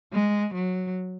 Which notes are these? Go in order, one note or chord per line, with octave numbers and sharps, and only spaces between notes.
G#3
F#3